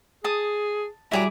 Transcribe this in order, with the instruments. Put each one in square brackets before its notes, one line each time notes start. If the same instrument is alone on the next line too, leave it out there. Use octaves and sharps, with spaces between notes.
[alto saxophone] G#4 [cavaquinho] A5 D#6
[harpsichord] F#3 G3 F#4 [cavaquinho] E4 G#4 D6